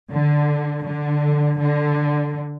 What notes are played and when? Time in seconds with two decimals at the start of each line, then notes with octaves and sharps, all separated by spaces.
0.12 D3
0.86 D3
1.59 D3